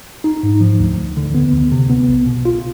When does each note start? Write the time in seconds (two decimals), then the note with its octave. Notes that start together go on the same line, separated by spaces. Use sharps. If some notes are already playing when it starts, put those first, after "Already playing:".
0.24 D#4
0.43 G#2
0.61 F3
0.79 D2
0.98 D2
1.17 D3
1.35 B3
1.53 D2
1.72 C3
1.90 B3
2.09 B1
2.26 B2
2.45 F4